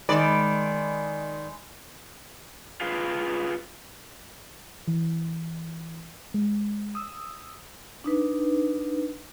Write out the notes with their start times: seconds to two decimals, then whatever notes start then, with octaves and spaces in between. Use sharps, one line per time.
0.09 D#3 G#3 D5 B5
2.81 F4 G#4 B4 F5
4.88 E3
6.34 G#3
6.95 D#6 E6
8.04 D4 D#4 B4